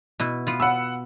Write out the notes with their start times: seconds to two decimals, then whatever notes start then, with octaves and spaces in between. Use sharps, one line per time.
0.19 B2 E4
0.47 B3 F4
0.60 F#5 B5 E6